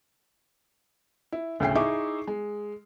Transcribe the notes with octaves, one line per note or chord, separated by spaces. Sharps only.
E4
D2 A2 C#3 G5 G#5 C7
D#4 E4 G#4 E5 C#6 D6
G#3